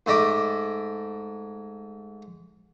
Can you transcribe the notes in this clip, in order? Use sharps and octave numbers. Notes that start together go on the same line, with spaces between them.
G#2 A3 D#5 B5 D6